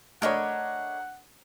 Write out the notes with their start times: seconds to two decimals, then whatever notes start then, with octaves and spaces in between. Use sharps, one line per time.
0.22 A3 D4 A#4 C#5 D#5 F#5 B5